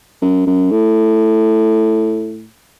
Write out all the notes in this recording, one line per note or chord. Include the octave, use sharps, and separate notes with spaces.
F#2
F#2
A2